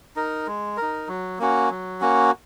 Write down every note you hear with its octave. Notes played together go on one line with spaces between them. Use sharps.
D#4 A#4
G#3
A#4
D#4
F#3
A#3 C#4 F#4
F#3
A#3 C#4 F#4